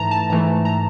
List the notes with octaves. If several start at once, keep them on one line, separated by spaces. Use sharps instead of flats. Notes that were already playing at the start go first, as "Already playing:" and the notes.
Already playing: G#2 E3 A3 A5 A#5
A5
G#2 E3 A3 A#5
A#5